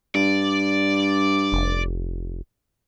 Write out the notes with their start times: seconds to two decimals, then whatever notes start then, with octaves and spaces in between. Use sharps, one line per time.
0.15 G2 D5
1.52 F1